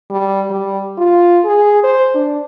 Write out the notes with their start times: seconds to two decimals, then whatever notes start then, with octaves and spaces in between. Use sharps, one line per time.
0.10 G3
0.50 G3
0.98 F4
1.45 G#4
1.83 C5
2.15 D4